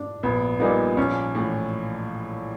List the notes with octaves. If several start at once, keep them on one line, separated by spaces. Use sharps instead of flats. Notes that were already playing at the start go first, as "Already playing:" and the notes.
Already playing: D4
A#1 B3
A#2 G3 A#3 B3 D#4
A#1 C#4
A2 E3